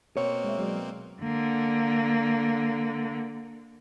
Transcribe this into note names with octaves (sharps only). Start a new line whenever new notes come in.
B2 A#3 C4 C#5
G#3 E5
F#3 G#3 D5
D3 A#3